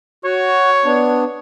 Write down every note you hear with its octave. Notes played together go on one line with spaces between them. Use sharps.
F#4 C#5
B3 D4